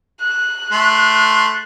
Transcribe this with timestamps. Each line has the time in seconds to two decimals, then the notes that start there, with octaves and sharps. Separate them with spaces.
0.21 F#6
0.72 A3 C6